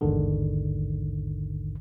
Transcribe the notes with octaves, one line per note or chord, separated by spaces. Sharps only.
A1 E2 G#2 D3 D#3